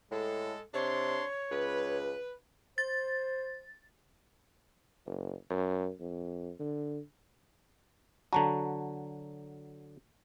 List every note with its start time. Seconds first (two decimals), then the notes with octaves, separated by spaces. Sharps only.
0.11 A2 G#3 A4
0.74 C3 D4 C#5 C6
1.51 C#2 B4
2.78 C5 A6
5.06 F#1
5.50 F#2
6.00 F2
6.59 D3
8.33 D3 F#3 F#4 A5 A#5